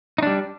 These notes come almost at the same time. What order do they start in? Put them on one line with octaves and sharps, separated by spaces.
D#4 D4 G3